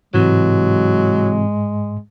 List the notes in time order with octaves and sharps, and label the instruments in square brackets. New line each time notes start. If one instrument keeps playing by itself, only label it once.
[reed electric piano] G#2 [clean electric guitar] C3 E3 [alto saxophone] F#3 [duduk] G#3